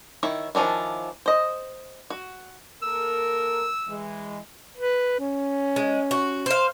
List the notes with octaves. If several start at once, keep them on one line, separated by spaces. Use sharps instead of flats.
D#3 E4 C#5
D#3 F3 C#4 D4 E4
C5 D#5
F#4
A#3 A4 A#4 E6
E3 G#3
B4
C#4
G#3
F#4
C5 F5